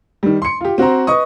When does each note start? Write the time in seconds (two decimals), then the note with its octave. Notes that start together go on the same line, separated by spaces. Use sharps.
0.23 D#3 G3
0.42 C6 C#7
0.61 F4 G4
0.78 C4 F#4 C5 A#5
1.07 B4 D#5 C#6 D#6